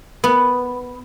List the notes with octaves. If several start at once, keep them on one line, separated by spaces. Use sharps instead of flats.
B3